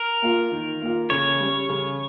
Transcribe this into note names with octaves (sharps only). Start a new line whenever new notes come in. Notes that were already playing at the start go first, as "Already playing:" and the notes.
Already playing: A#4
A#3 F4
D#3
A#3 F4
C#3 C#5
G3 C#4
C#3